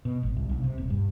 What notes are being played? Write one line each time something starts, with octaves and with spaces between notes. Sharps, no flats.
B2
G#1
C2
B1
C3
D#1
G2